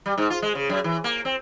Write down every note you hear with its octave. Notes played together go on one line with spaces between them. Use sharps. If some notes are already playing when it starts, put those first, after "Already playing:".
G3
G#2
F4
G#3
C#3
F#2
E3
A#3
C4